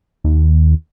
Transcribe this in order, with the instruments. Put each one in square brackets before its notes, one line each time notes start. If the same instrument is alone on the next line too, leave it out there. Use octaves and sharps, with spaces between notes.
[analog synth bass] D#2